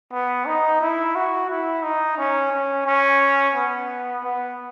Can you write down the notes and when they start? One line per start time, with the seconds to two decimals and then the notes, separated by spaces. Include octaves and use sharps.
0.12 B3
0.46 D#4
0.81 E4
1.15 F#4
1.50 E4
1.83 D#4
2.18 C#4
2.53 C#4
2.86 C#4
3.55 B3
4.24 B3